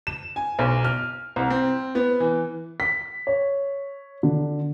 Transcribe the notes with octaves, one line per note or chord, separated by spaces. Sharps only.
E7
G#5
B1
F6
C2
C4
B3
E3
B6
C#5
D3